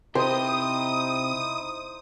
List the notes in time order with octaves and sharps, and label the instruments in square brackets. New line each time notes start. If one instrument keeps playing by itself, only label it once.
[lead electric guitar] C3 G4 [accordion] D#4 E4 [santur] C5 [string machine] D#6